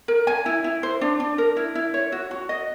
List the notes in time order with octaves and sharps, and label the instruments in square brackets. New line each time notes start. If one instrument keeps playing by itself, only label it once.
[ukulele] A#4
G#5
E4
E4
C5
D4
D4
A#4
E4
E4
C#5
F#4
F#4
D#5